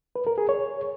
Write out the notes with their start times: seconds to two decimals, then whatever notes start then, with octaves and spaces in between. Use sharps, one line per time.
0.16 B4
0.27 A#4
0.38 G#4
0.49 C#5